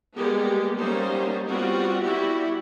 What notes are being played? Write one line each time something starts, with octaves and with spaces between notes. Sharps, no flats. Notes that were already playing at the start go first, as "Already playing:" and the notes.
G3 G#3 A#3 B3 G4
F#3 G3 A#3 C#4 D#4 C5
G3 B3 C4 F4 F#4
G3 E4 F#4 G4